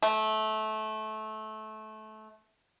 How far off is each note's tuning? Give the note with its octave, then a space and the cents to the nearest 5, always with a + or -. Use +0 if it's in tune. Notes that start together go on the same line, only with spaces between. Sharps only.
A3 -20